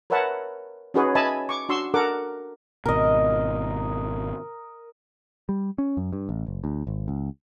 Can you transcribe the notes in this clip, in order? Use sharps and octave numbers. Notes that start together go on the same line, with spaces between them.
A#4 B4 C#5 E5 F#5 A5
C#4 D#4 F#4 G#4 B4 C#5
B4 D#5 E5 G#5 A5 B5
C#6 D6
D4 F#4 C6 C#6 E6
D4 A4 A#4 F#5 D6
G#1 B2 A#4 D#5
G3
C#4
F#2
G2
A1
F#1
D2
G#1
C#2